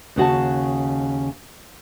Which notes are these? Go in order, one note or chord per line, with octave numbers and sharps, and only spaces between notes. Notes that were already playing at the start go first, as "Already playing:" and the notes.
D#2 C#3 F#4 A5